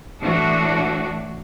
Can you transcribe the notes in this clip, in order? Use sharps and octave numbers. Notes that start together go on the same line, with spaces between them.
A2 E3 D4 F#4